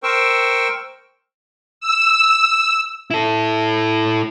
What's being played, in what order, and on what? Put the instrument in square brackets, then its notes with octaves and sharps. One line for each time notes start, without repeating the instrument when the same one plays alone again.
[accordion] A#4 C5 G5 C#6 E6
[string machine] E6
[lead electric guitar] E4 A4